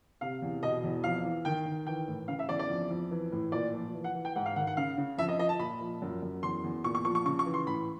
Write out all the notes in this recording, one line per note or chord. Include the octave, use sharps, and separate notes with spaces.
C3 F5
E2
B2 D#5
E2
F2 F5
E3
D#3 G5
D#3
E3 G5
A2
C#3 F5
E5
E2 D5
D5
F2
F2
E3
A2
A#2 D5
F3
E3
F#5
E3
G5
G#2 F#5
F5
D#3 F#5
F#5
C#3 F5
C#3
F2 E5
D#5
F3 D#5
A5
A#2 B5
F3
F#2
F#2
E2 C6
E2
A#2 C#6
C#6
F3 C#6
C#6
C#3 C#6
C#6
E3
C6
A2 B5